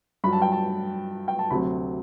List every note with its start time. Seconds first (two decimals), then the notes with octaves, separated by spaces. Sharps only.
0.24 G2 F#3 B5
0.33 A5
0.42 G5
0.52 A5
1.28 G5
1.39 A5
1.50 D2 C3 F#3 B5